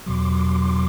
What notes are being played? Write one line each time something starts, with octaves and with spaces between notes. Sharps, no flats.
E2 B2 F#3 C6 D6